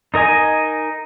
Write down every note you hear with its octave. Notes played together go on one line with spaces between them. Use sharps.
D#4 A#4 D#5 G#5